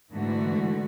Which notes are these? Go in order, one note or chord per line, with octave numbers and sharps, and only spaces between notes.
G#2 D3 E3 A3 F#4